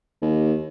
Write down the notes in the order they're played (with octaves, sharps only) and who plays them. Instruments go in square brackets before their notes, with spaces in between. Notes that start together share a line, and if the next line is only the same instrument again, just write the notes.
[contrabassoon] D#2